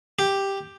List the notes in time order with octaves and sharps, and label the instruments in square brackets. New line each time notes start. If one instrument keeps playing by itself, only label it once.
[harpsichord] G4